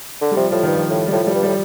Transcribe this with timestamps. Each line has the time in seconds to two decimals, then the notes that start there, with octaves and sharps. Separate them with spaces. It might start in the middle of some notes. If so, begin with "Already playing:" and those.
0.21 D3
0.31 G3
0.36 C3 F3
0.51 A2 F3
0.63 G2 D#3
0.75 F3
0.90 A2
1.08 G3
1.12 A2 F3
1.23 A2
1.27 G3
1.35 G2
1.43 A2 G3